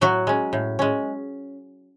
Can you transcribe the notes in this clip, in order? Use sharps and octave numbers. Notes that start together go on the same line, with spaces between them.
A2 F#3 F#4
G#3 C#4
A2
G#3 C#4